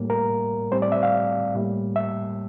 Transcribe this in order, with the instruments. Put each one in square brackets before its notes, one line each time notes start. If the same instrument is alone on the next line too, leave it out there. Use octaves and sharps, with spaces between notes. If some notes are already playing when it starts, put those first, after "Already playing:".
Already playing: [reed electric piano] A2 G3 A#3
A#4
A2 G3 C4 C5
D5
E5
F5
A2 G3 A#3
E5